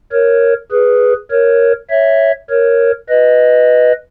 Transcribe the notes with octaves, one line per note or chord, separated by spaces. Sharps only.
A#4 C#5
G#4 B4
A#4 C#5
C#5 E5
A#4 C#5
B4 D#5